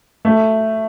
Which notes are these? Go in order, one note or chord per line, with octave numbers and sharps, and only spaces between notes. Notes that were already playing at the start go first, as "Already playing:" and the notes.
A3